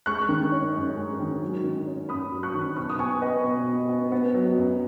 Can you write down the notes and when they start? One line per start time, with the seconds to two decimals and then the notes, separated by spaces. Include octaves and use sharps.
0.06 G#3 C#6 F#6
0.29 D#3
0.52 C#4
0.74 F#2
0.97 G#3
1.19 D#3
1.41 F#3
1.64 D#3
1.87 C#4
2.09 F#2 B5 D#6
2.32 F#3
2.43 C#6 F#6
2.54 D#3
2.76 B2 C#6 F#6
2.90 D#6
2.99 B3 G#5 C#6
3.22 B3 B4 D#5
3.44 B2
3.68 B2
3.89 B3
4.12 B3
4.34 F#3
4.57 F#2